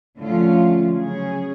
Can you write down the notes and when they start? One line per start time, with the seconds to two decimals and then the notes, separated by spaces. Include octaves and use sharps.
0.18 D3 F3 A3 C#4 F4
0.93 C#3 F#3 C#4 G#4